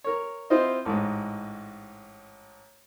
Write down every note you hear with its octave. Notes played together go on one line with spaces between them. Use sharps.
A#4 C#5
C4 E4 F4 C5 D#5
A1 G#2 G#3